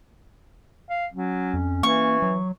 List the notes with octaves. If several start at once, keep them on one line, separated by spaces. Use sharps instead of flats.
F5
F#3 C#4
F2
E3 A#3 C#6
F#3